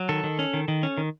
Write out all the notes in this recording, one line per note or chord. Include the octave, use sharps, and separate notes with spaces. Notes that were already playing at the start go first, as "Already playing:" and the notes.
Already playing: F#3
D#3 A4
D#3
C#4
D#3
D#3
C#4
D#3